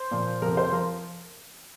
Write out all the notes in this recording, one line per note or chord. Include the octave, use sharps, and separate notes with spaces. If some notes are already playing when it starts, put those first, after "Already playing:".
Already playing: C5
A#2 F3
F2 C3 F3 A#4
C5
F3 A#4